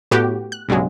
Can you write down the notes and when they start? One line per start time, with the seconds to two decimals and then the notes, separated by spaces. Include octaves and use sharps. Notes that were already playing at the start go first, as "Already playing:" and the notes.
0.11 A2 B3 F#4 G4
0.52 F#6
0.69 B1 G2 C#3 F#3 G#3